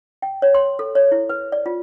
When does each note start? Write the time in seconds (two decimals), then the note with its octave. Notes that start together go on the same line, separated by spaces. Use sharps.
0.22 G5
0.42 C#5
0.55 C6
0.79 A4
0.95 C#5
1.12 E4
1.29 B4
1.52 D5
1.66 F4